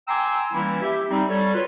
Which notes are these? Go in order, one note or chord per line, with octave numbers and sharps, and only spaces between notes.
G5 G#5 A#5 C6 D6 E6
E3 G3 A#3 C#4 E4
G4 E5
G3 C4 D#4
G3 A4 C#5
F4 F#4 B4 C#5